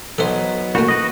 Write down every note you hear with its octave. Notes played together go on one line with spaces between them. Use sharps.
F#3 B3 D#4 A4 C5
A1 A3 A#3 F#4 A#4 B5
F#4 B4 D#5